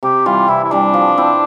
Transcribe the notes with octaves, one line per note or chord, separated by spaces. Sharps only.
C3 G4
E3 G3 F4
C3 E4
E4
E3 G3 D4
F3
C4 E4